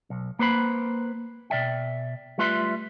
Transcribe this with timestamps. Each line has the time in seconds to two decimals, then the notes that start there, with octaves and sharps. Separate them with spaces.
0.10 B1
0.39 A#3 B4 C5 B5
1.50 B2 D5 E5 G5
2.38 G3 A3 F4 B4 E5 C6